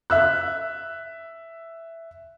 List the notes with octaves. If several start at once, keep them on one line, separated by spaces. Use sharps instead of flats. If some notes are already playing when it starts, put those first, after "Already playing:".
E5 E6 F#6